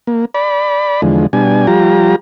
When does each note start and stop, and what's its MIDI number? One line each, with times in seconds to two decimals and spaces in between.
0.07 0.25 58
0.34 1.01 74
0.34 1.01 83
1.02 1.27 40
1.02 1.27 50
1.02 1.27 53
1.02 1.27 56
1.33 1.67 47
1.33 1.67 55
1.33 1.67 62
1.33 1.67 80
1.67 2.16 53
1.67 2.16 55
1.67 2.16 65
1.67 2.16 67
1.67 2.16 82